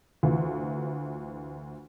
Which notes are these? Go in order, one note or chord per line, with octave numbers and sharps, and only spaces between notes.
D2 E3 F4